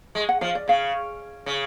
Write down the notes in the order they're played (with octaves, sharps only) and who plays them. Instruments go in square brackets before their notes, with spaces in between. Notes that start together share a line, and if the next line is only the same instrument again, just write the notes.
[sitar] G#3
[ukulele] F#5
[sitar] F3 [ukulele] F5
[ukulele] D5
[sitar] C#3 [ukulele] F5
[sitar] C#3